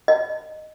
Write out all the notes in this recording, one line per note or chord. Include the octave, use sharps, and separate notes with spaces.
D#5